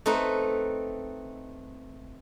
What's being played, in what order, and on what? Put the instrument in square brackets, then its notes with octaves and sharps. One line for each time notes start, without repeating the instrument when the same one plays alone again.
[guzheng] A3 C4 D#4 B4